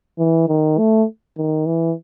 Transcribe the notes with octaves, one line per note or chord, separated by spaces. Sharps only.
E3
D#3
A3
D#3
E3